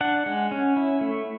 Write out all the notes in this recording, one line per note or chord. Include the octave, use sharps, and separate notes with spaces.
D4 F#5
G#3
C#4
E4
A3